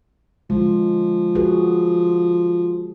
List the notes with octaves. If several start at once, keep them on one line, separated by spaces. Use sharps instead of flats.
D3 F3 G#3
F#4 G#4 B4